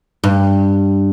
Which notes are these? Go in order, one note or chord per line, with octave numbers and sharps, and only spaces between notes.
G2